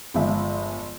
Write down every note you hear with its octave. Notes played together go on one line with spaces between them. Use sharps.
G1 F3 G#3 E5